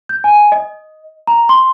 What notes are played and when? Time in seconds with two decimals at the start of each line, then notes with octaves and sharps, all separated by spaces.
0.09 G6
0.24 G#5
0.52 D#5
1.27 A#5
1.49 C6